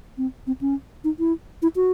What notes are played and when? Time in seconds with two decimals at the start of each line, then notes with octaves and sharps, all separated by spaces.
0.18 C4
0.47 C4
0.61 C#4
1.04 D#4
1.19 E4
1.62 E4
1.76 F#4